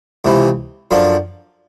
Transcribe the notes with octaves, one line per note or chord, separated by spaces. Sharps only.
C#2 C3 E3
F#2 D3 F3